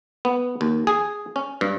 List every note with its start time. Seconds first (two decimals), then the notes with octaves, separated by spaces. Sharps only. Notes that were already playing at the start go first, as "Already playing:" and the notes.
0.25 B3
0.61 D#2
0.87 G#4
1.36 C#4
1.61 G2